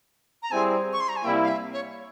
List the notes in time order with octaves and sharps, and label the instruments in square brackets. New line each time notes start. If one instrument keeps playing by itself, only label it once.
[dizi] A#5
[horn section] G3 C4 E4 G#4 C5 [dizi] G#5
[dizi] C#6
C6
A#5
G#5
[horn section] C3 G3 A#3 E4 [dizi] G5
[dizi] F5
E5
C#5